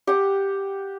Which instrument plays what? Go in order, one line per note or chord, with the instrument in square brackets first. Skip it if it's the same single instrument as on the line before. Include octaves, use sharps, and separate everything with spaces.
[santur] G4 F#5